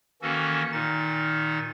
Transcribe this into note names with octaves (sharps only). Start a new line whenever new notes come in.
D#3 E3 A#3 C#4 F#4 A4
A#2 D#3 D#4 A6